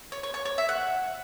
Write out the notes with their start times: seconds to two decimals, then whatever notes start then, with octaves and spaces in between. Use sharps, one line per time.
0.12 C#5
0.23 C#5
0.34 C#5
0.45 C#5
0.58 E5
0.69 F#5